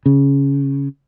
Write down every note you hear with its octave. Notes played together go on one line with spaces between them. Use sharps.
C#3